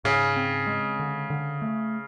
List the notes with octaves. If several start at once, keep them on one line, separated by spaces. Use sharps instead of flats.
G#2 C#3
C4
G#3
D3
D3
A3